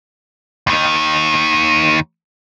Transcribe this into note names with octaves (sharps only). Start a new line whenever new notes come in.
D#2 D#3